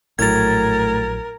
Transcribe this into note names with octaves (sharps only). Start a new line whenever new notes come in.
A#1 A2 F#3 A#4 G#6 A6